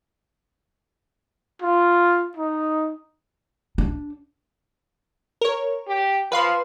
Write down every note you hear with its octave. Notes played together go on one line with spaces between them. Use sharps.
F4
D#4
D4
A#4 C#5
G4
F3 B4 F5 C6